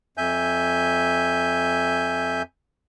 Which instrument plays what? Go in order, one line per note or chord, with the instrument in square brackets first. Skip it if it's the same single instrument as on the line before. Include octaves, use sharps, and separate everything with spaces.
[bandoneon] F2 E5 G#5 G6